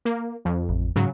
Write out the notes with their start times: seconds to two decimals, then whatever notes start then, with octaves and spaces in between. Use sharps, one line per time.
0.05 A#3
0.45 F2
0.69 A1
0.96 G#2 C#3 F#3